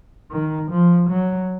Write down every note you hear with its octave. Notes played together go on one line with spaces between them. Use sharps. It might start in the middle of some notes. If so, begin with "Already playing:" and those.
D#3
F3
F#3